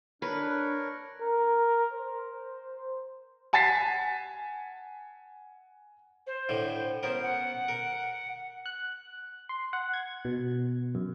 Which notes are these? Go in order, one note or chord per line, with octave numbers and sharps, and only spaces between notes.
D4 A#4 B4 C#5
A#4
C5
F#5 G#5 A5 A6 B6 C7
C5
A2 D3 E3
B3 C#4 A#4 C5
F#5
A#4
F#6
C6
F#5
G#6
B2
F#2